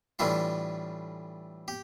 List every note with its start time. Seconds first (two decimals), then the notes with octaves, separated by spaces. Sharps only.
0.19 A2 E3 G3 D4 F4
1.68 G4